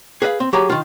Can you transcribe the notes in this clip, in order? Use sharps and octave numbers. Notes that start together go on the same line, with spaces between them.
G#4 B4 D#5 F5
C4
F#3 G4 G#4 A#5
D#3 F4